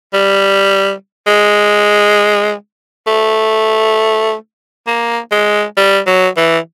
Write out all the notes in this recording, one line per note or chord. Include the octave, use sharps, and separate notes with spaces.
G3
G#3
A3
A#3
G#3
G3
F#3
E3